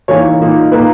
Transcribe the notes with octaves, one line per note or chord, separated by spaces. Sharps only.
E3 A#3 D#4 C#5
A#2 A#3 D#4
A#2 A#3 D#4 B4